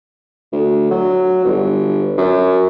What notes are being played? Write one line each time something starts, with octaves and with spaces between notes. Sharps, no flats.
D2
F#3
G1
F#2